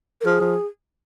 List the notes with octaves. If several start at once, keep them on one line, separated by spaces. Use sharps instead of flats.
A#4
F3 G#4
F3